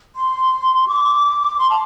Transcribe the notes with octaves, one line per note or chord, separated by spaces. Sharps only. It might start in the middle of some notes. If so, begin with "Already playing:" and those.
C6
D6
C6
A5